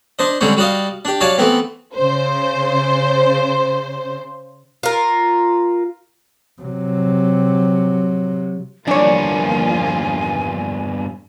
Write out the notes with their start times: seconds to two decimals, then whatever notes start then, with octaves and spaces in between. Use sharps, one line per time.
0.19 D4 C5 D#5
0.41 D3 G3 G#3 C4 C#4
0.57 G3 F#4 D5 D#5 F5
1.05 D4 G4
1.21 F#3 C#5 D5 F5 A5
1.38 E3 A3 B3 C4
1.95 C#3 C5
4.83 F4 A#4
6.62 C3 F#3
8.87 E2 G2 F3 A#3 D4 F4 C#5 G#5